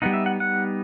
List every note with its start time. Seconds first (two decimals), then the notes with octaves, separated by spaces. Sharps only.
0.02 G3 B3 D#4 F#5
0.13 E5
0.26 F#5
0.40 F#5